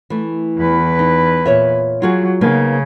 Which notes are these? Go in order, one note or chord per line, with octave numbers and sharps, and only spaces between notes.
E3 A3
E2 B4
D#4
A#2 C#5 E5
F#3 F4 F#4 G#4
C#3 A#3 B3 D#4